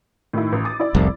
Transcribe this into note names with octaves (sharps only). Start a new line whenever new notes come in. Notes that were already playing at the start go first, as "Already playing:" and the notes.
A2 D#3 E4
A1
D6 D#6 A6
E4 D5
F1 C2